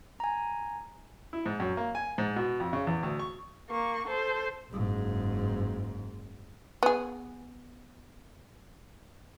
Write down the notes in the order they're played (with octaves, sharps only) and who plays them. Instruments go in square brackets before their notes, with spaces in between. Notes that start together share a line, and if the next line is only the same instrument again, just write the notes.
[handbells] G#5 A#5
[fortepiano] E4
G#2
F#2
A#3
G#5
G#2
B2
F2
C#3
E2
D2
C#6
[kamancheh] A#3 C#6
A4 C5
[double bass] F#1 G#2
[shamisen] B3 G#4